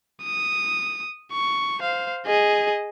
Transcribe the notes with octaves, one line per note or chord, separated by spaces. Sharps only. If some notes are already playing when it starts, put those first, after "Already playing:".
D#6
C#6
C5 F5
G#4 D#5